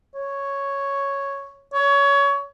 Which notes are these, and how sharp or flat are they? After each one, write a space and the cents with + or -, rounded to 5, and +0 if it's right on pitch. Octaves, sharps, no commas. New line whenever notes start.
C#5 +0
C#5 +20